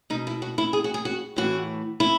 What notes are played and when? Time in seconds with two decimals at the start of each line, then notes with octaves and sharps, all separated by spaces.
0.10 B2 D#4
0.27 E4
0.42 F#4
0.58 E4
0.73 G#4
0.84 F#4
0.94 G#4
1.05 F#4
1.36 A2 E3 F#4
2.00 E4